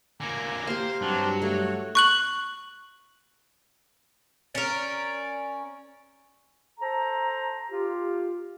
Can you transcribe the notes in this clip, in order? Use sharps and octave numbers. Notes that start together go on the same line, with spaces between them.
D3 A#3 G#5 A#5 D6
A#3 G4 C5 F5 C6
G2 F#3 C4 D4 D5
A3 F#4 C#5
C#6 F#6 F#7
C#4 A#4 D5
A4 C5 A#5
F4 G4